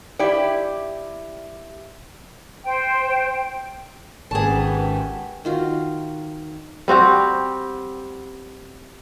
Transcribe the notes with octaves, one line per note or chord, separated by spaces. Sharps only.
E4 G4 D5
C5 G5
G#1 G#3 C#4 G4 G#4 B4 F#5 A5
D#3 F4 F#4
G3 C4 F#4 G4